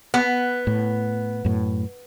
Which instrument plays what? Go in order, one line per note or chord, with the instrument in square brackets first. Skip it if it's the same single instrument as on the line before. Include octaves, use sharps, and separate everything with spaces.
[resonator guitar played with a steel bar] B3
[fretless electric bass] A2
F#2 A2